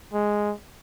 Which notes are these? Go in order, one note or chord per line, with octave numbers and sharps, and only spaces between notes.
G#3